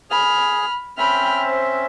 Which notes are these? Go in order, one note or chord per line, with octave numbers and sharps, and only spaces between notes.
G#4 B5 F6
C4 C#4 E5 G5 B5 F6
C5